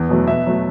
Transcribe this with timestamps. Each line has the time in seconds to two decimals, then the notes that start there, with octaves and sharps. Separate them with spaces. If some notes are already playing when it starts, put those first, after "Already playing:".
Already playing: E2
0.09 B2 F#3 A3
0.27 B2 E5
0.46 F#3 A3